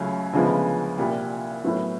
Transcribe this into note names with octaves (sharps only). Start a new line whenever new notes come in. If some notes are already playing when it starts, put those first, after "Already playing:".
Already playing: C#2 C#3 F#3 A3 C#4
D2 C#3 F3 G#3 B3
C2 A#2 G3
A2 F#3 B3